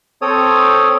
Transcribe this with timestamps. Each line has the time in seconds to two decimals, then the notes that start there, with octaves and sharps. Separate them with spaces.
0.22 C4 A4 C#5 D#6